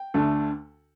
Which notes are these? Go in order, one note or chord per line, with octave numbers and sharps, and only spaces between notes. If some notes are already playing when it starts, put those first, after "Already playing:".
Already playing: G5
D2 D3 A3 D4